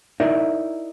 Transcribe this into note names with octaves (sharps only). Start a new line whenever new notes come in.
D#4 E4 A#4 D5 E5